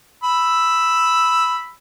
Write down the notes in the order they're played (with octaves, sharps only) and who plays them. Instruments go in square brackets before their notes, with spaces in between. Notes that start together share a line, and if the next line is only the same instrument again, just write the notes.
[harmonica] B5 E6